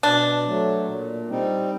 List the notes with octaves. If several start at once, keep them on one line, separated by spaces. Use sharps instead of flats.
B2 D4
F#3 A3
A#2
G3 C4 D#4